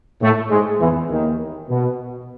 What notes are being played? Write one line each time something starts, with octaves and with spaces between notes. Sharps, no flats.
A2 A3
G#2 G#3
E2 E3
D#2 D#3
B2